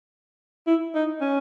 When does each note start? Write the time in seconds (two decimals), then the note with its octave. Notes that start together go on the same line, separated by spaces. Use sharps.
0.67 E4
0.95 D#4
1.21 C#4